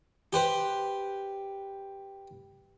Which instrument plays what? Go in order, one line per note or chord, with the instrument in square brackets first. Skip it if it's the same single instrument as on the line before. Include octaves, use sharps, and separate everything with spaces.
[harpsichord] G4 B4 C5